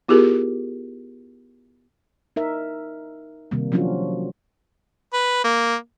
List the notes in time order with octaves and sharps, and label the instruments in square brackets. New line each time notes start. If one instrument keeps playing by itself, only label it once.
[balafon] B3 E4 F4 G4 G#4 A#4
[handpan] D#4 A#4 E5
C3 D#3 G3 A#3
F3 F#3 C#4 D4 F4 F#4
[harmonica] B4
A#3